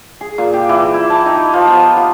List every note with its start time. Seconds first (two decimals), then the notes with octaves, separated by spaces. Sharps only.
0.21 G#4
0.38 A#2
0.54 G4
0.69 E3
0.94 E4
1.10 A5
1.26 D#4
1.37 G4
1.54 F3
1.67 B3
1.96 F4